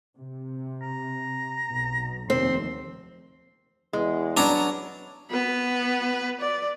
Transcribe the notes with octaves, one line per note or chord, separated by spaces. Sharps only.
C3
A#5
B1 B2
F1 D#2 C4 C6
E2 G#3
F#3 B3 C#4 D4 A#5
B3 B4
D5